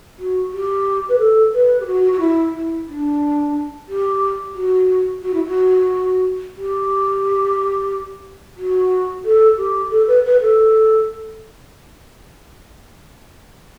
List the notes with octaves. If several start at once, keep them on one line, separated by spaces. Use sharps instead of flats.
F#4
G4
B4
A4
B4
G4
F#4
F#4
E4
E4
D4
G4
F#4
F#4
E4
F#4
G4
F#4
A4
G4
A4
B4
B4
A4